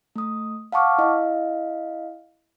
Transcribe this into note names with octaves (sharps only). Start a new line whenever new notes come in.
A3 D#6
F5 F#5 A5 C#6 D6 F6
E4 D#5 F5